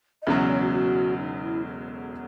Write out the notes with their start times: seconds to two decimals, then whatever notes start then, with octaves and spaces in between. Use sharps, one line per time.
0.22 D#5
0.26 E1 E2 C#3 F#3 E5
0.38 D#5
0.49 C#5
0.61 F#4
0.72 F#4
1.18 D#4
1.42 E4
1.65 A4